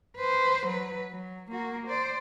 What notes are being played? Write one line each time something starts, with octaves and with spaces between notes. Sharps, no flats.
B4 C5
F#3 B4
F#3
A#3 F#4
C5 D5